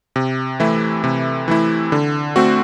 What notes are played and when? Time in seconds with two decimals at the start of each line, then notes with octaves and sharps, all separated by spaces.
0.16 C3
0.60 E3 A3 E4
1.04 C3
1.48 E3 A3 E4
1.92 D3
2.36 A3 C4 F#4